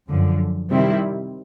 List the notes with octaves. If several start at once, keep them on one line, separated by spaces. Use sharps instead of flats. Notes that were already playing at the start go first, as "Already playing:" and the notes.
F#2 D3 F3
C3 D#3 G3 C4 E4